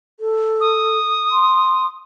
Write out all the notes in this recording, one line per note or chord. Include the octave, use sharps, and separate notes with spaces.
A4
D#6
C6